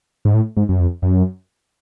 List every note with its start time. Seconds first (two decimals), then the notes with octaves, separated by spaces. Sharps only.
0.25 G#2
0.34 A2
0.57 G#2
0.69 F#2
0.80 F2
1.02 F#2